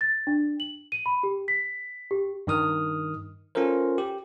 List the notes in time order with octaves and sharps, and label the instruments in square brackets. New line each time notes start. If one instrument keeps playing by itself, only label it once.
[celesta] A6
D4
F#7
D#7
B5
G4
B6
G4
[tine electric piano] G2 D#3 D#6 F6
C#4 F4 A4 A#4 C5
G4